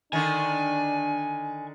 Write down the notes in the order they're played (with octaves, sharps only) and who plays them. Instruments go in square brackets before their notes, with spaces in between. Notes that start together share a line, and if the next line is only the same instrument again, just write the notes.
[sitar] D3 D#3 [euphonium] D4 [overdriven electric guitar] G#5